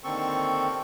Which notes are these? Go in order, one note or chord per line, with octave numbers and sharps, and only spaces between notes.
D#2 D3 D#3 C4 A4 C#6